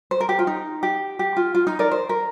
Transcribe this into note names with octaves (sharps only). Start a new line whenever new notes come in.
C5
A#4
G4
F4
D#4
G4
G4
F4
F4
D#4
A#4 D5
C5
A#4